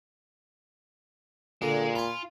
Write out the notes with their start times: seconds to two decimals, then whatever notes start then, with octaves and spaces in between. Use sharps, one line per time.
1.62 A#2 D3 G#3
1.96 F4 G#5 B5